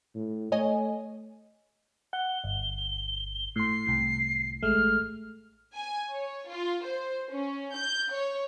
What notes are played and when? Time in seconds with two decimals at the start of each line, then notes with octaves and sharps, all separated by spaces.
0.15 A2
0.52 A3 C#5 D#5 G#5
2.13 F#5 G7
2.44 G1
3.56 A2 C6 C7
3.87 C2 A2
4.63 A1 G#3 A3 F6
5.75 G#5
6.13 C#5
6.51 F4
6.85 C5
7.32 C#4
7.77 G6
8.13 C#5